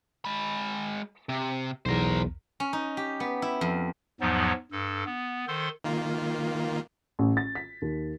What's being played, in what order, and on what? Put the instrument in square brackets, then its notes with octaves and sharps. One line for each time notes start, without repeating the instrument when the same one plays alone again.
[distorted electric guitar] G#3 B5
C3
[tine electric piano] B1 E2 [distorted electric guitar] A#4 C5
[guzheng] C#4
D#4
G4
B3
E4
F2
[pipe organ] E2 G#2 F3 F#3 B3 D#4
G2 A4
B3
D#3 A4 C5 C6
[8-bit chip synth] D#3 A#3 F4
[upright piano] A1
A6
B6
D#2